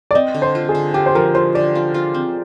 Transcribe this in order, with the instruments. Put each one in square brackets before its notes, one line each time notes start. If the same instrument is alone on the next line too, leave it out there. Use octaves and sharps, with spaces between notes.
[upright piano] D5
[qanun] C4 [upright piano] D#5
[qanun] D3
[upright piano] C5
[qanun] F4
[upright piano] G#4
[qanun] D3
[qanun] F4 [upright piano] G4
[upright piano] C5
[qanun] F3 [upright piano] A#4
[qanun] F4 [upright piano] C5
[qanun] D3 [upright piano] D5
[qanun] F4
F4
C4